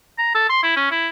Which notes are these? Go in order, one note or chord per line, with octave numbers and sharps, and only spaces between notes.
A#5
A4
C6
E4
C#4
E4